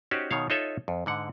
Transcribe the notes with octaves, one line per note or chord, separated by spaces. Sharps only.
C#4 D#4 F#4 G4 C5 D5
B2 D#3 C#5 F5
D#4 F4 A4 C#5 D#5 E5
F2
G#2 D3 F#5